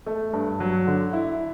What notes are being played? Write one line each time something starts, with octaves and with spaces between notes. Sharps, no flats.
A3
G2
F#3
D3
E4